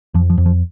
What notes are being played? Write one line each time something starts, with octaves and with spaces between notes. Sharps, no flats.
F2 F3
F3
F2
F3